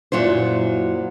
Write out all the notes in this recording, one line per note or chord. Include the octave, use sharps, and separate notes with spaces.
F#2 A#2 F#3 E4 C5